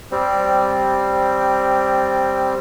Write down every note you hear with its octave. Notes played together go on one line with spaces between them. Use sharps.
G3 C4